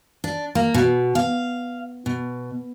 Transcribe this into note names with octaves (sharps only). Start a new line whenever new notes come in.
D4
A#3
B2
F5
B2